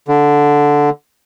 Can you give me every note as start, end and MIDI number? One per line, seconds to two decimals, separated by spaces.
0.08 0.90 50